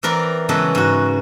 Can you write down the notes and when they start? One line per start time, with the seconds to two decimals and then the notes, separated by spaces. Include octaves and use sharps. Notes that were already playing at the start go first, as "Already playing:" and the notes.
0.03 E3 C4 A#4 D5 B5
0.49 C#3 E3 F#3 G#3 B3 A4
0.75 G#2 F#4